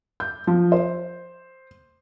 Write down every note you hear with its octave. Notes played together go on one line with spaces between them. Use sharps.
G6
F3
C5